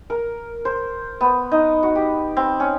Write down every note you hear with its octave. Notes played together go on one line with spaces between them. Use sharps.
A#4
C5
B3
D#4
F#4
G4
C4
C#4